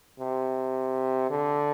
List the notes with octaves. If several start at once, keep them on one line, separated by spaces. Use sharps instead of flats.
C3
D3